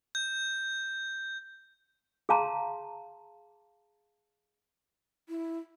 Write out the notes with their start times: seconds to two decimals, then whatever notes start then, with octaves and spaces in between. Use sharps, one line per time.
0.15 G6
2.29 G#4 F5 A5 A#5 C6
5.29 E4